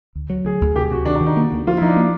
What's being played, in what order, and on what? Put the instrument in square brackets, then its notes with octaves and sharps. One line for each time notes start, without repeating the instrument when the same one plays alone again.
[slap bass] D2
F#3
[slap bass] D2 [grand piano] G#4
[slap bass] D2
[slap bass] C3 [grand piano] G4
[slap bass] C3 [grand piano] F#4
[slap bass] D#3 [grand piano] D4
[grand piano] D4
[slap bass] D#3
[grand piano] D#4
[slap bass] A#3
D2
[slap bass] F3 [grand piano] F4
[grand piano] E4
[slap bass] F3 [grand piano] D#4
[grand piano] D4
[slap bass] A#3